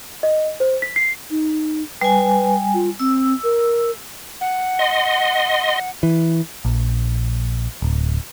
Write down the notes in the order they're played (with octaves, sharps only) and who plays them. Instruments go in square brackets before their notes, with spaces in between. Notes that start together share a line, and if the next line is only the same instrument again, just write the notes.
[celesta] D#5
C5
B6
C7
[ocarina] D#4
[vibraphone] G3 G#5 [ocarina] B4
[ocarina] F4
[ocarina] C4 [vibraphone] E6
[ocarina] A#4
[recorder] F#5
[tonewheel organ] D#5 C6
[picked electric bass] E3
A#1
D1